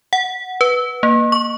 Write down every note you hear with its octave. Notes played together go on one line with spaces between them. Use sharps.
F#5
B4
A#3
C#6